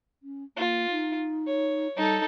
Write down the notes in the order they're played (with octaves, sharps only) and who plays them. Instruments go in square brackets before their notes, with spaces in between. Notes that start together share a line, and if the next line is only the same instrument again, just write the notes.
[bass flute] C#4
[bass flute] A#3 [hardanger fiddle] F4
[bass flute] D#4
[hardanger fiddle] C#5
[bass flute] G3 [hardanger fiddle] D#4 A4